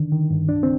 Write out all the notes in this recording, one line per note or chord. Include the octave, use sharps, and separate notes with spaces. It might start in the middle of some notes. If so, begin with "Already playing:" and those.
Already playing: D3 D#3 D4
D#3
G2
C2 D4
C4